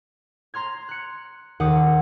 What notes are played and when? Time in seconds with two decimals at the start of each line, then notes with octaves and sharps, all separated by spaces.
0.54 A#5 C6 F6 G#6
0.89 F#6 C#7
1.60 D#2 D#3 F#5 D6 D#6